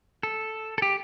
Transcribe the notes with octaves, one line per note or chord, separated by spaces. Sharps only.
A4
A4
G4